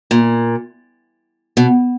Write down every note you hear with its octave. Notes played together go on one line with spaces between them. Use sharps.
A#2
B2